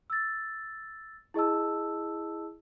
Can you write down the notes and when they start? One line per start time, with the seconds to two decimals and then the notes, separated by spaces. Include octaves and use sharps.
0.10 E6 A6
1.34 E4 G#4 D#5 A5 E6